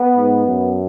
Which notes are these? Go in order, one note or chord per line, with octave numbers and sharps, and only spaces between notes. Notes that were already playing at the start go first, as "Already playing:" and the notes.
Already playing: B3
G#2
F#2